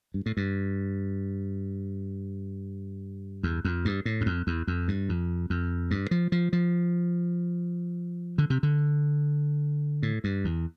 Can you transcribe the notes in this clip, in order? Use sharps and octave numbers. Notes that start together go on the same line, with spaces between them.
G2
A2
G2
E2
F2
G2
A2
G2
F2
E2
F2
G2
F2
F2
G2
F3
F3
F3
D3
C3
D3
A2
G2
E2